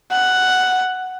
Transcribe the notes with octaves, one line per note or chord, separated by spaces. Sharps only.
F#5